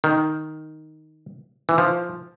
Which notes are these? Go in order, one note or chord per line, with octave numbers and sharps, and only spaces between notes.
D#3
E3
F3